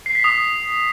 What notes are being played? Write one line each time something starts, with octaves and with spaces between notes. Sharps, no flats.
C7
B6
D#6